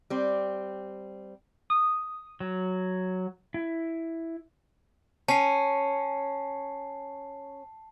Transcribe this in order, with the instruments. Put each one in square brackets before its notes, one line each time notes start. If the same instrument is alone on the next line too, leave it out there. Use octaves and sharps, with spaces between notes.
[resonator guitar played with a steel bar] G3 C4
[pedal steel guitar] D#6
F#3
E4
[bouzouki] C#4 [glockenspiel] A5 C7